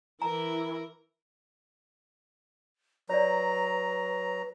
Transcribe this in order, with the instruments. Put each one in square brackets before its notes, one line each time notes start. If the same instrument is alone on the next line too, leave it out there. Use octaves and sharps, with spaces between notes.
[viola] E3 E4 [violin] A#4 [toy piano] A#5
[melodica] F#3 A#5 [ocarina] B4 [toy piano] C#5 D5